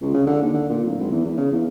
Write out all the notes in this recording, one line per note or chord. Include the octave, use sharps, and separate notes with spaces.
C#2
C#3
D3
D#2
D3
A#2
D1
G#1
E2
E2
C#3
E2